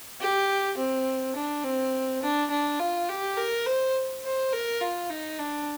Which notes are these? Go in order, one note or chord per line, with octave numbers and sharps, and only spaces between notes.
G4
C4
D4
C4
D4
D4
F4
G4
A#4
C5
C5
A#4
F4
D#4
D4